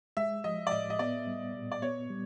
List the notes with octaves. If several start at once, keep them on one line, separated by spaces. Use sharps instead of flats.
G#3 E5
F3 D#5
D5
A2 D#5
D#5
B3 D5
G3
A#2
D5
B3 C#5
G3